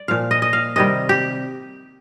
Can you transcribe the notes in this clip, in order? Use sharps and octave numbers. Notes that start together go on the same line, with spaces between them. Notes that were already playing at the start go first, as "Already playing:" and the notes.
Already playing: D5
A#2 F3 F5
D#5
D#5
F5
C3 D#3 G3 D#5
G4